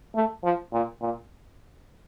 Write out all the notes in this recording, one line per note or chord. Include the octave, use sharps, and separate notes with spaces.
A3
F3
A#2
A#2